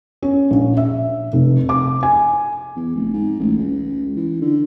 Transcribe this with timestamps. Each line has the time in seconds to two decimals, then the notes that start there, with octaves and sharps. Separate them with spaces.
0.22 C#4
0.51 A#1
0.77 E5
1.33 F1
1.69 D6
2.03 G#5
2.76 E2
2.95 F1
3.13 G#2
3.39 A1
3.57 C#2
4.16 E3
4.41 D3